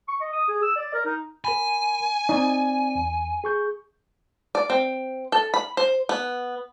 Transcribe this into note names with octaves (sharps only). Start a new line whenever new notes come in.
C#6
D#5
D#6
G#4
E6
D5
A#4
D#4
A#4 G#5 B5
C4 D#4 D5
E2
G#4 C#6 G6
D5
C4
A4
B5
C5
B3